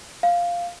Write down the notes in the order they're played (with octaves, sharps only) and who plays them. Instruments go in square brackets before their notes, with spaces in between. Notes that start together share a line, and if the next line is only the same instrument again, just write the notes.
[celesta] F5